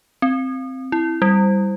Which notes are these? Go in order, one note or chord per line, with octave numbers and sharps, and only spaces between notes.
C4
E4
G3